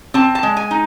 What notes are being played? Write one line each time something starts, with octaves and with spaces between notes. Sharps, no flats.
C4 A5
A5
G#3
G#5
D#4